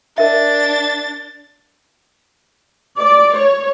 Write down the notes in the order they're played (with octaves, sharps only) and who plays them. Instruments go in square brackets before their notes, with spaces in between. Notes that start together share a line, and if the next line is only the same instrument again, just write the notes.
[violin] D4 A6 [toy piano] A#4 D#5 E5
[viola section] D5
C#5